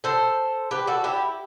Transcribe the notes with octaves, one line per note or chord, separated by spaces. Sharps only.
A4 C5
G4 B4
F#4 A4
E4 G4